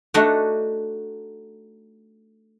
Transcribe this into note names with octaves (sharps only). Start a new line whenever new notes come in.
A3 D4 D#4 F#4